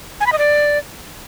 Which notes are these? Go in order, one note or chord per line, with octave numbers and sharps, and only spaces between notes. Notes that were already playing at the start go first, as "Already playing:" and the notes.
G#5
B5
D#5
D5